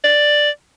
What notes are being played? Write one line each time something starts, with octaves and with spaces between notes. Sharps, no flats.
D5